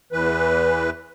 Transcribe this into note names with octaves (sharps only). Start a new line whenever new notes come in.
E2 E3 B4